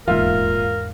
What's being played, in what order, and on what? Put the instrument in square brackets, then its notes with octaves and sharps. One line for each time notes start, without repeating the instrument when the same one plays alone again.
[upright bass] D#1 C#3 [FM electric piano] E2 G#2 F5 [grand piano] F4 E5 [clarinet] A#4